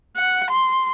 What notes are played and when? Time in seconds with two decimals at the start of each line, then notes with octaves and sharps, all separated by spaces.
0.16 F#5
0.50 C6